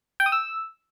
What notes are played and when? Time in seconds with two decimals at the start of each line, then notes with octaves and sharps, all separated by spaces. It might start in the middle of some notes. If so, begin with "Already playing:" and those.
0.20 G5
0.26 D#6
0.32 E6